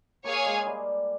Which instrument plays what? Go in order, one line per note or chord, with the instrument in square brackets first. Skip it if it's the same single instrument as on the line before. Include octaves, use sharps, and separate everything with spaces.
[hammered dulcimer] A#3 [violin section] G#4 C#5 F5 G#5
[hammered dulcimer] G#3
G3